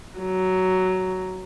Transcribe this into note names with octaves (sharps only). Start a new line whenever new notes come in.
F#3